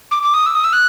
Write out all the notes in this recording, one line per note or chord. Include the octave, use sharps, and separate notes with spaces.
D6
D6
D#6
E6
D#6
E6
F#6